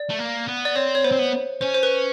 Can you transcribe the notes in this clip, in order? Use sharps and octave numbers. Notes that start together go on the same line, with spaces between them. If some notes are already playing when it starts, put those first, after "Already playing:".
Already playing: D5
A3
A#3
B3
D5
C4 C#5
C#5
B3 C5
C4
B3
C#4 C5
C5
B4